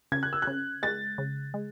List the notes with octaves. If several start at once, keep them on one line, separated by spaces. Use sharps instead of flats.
C#3 G#6
F#6
E6
C#3 F#6
G#3 A6
C#3
G#3